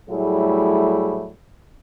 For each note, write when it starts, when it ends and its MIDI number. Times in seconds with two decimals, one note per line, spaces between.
0.10 1.31 45
0.10 1.31 54
0.10 1.31 55
0.10 1.31 57
0.10 1.31 64
0.10 1.31 68